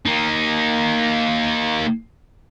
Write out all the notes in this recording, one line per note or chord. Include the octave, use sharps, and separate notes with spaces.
A#3 D#4